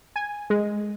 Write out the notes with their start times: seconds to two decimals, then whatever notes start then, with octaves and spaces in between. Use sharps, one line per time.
0.16 G#5
0.50 G#3